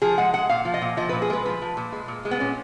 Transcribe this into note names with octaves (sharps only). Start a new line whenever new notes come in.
F3 G#4
G#3 F#5
G#3 F#5
A#2 F5
F3
D#5
A#2
F3 D#5
B4
A#2
G#4
G#3 B4
F3 B4
F3
A#2
G#3
A#2
G#3
B3
A#2 C#4